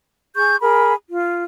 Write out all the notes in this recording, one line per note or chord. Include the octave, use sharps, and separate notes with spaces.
G#4 C#6 G6
G#4 A#4 B5
F4